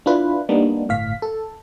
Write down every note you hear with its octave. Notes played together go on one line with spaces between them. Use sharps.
D4 E4 F4 B4
G3 A#3 B3 D4 D#4
G1 A2 F5 B6
A4